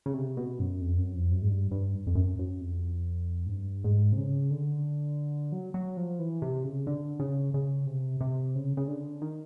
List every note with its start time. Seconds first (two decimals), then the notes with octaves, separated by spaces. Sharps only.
0.06 C#3
0.14 C3
0.37 B2
0.59 F#2
0.81 F2
0.98 F#2
1.15 F2
1.32 F#2
1.42 G#2
1.48 G2
1.71 G2
2.07 F2
2.15 F#2
2.39 F#2
2.61 F2
3.46 G#2
3.50 G2
3.84 G#2
4.12 C3
4.18 C#3
4.50 D3
5.52 F#3
5.74 F#3
5.97 F3
6.19 E3
6.42 C3
6.64 C#3
6.87 D3
7.20 C#3
7.54 C#3
7.86 C3
8.21 C3
8.55 C#3
8.77 C#3
8.88 D3
9.22 D#3